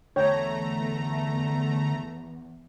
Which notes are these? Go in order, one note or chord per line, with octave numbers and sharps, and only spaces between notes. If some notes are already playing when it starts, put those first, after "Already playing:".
E2 D3 A3 C#5 G5 A#5